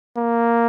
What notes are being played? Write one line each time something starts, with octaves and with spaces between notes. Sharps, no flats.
A#3